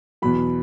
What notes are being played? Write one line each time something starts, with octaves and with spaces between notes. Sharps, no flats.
E2 B2 F#3 B5